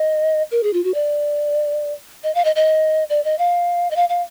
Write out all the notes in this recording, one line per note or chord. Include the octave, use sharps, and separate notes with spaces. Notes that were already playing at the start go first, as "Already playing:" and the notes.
Already playing: D#5
A#4
G#4
F4
F#4
D5
D#5
F5
D#5
D#5
D5
D#5
F5
D#5
F5
F5